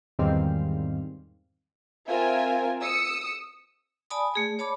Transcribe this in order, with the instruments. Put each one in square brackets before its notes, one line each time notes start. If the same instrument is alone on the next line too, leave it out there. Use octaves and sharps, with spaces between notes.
[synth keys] E2 G#2 D#3 G3 C4 F5
[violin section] C4 F4 A#4 E5 G#5
D#6 E6 C#7
[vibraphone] D5 G#5 A5 B5 D#6
A3 G#4 D5
C#5 A5 B5 D6